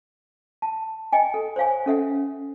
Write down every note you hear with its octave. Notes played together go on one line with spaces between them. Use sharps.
A5
D#5 G5 G#5
A4
C5 C#5 F5 G#5
C#4 A4 E5 F#5